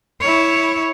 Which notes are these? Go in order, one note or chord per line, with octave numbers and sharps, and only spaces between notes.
E4 C#5